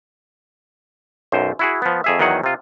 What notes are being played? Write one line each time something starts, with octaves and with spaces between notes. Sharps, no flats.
B1 F#2 C5
E4 F#4 G#4
F3 B3
F2 G#4 E5
E2 D#3 F#3 G#4 F#5
C3 F4